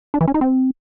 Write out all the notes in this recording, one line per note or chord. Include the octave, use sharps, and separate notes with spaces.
D4
E3
C#4
D#4
C4